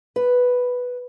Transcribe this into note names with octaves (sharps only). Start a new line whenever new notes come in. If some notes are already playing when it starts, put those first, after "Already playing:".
B4